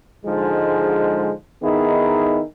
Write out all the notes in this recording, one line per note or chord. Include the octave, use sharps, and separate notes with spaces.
G#2 D3 F3 G#3
D#3 B3 D#4 E4 G#4